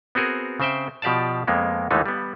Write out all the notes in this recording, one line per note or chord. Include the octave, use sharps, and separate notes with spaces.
B3 C4 F#4 G#4 A#4
C#3 C4 C5 E5 G5
B2 F3 G4 D5 F5 A5
F2 G#3 A#3 B3
D#2 D3 E3 G#3 A3 D#4
G3 B3